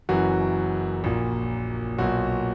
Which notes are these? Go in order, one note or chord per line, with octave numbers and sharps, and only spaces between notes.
F#1 F#2 E3 F#4
A#1 A#2
B1 A#2 F#4